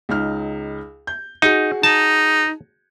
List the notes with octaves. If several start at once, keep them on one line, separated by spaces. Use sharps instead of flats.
C#2 D#4 F6
G6
D#4 F#4 G#4 C#7
D#4 A5